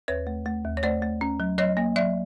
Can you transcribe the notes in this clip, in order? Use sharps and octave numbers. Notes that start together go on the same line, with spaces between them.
D#2 B4 C#5
A3
A3
D#2
C#5
A3 C5 D5
A3
C#4
F#3
F#3 C#5 D#5
A#3
F#3 D5 E5